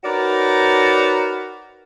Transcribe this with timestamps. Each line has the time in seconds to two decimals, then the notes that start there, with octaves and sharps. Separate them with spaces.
0.04 D#4 F#4 A#4 B4 C#5 D5